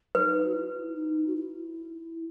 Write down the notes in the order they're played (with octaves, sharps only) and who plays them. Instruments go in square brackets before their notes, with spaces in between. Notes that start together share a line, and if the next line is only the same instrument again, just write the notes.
[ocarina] D#4 [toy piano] B4
[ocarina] F#4
E4
E4
D#4
F#4
E4